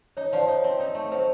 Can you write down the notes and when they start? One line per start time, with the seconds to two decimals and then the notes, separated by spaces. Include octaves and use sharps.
0.17 D#4 C#5
0.33 F3 C5 D5
0.48 D#4 C#5
0.64 C4
0.80 D#4
0.95 A3
1.11 F#3 C5